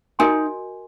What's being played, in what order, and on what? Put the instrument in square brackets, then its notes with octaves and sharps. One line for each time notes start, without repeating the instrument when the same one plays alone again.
[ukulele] D#4 [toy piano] F#4 A#4 D#5 G#5 C6